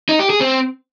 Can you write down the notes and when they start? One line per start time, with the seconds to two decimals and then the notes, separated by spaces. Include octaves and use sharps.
0.09 D#4
0.19 G4
0.30 G#4
0.40 C4